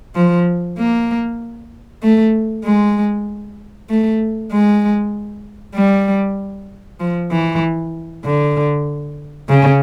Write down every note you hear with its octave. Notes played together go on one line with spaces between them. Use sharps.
F3
A#3
A3
G#3
A3
G#3
G3
F3
E3
D3
C#3